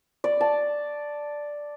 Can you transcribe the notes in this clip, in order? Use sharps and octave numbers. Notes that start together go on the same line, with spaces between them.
D5
A5